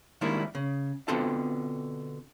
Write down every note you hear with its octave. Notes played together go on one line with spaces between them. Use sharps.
D#3 G3 G#3 A#3 D4 E4
C#3
B2 D3 C4 F4 A4 A5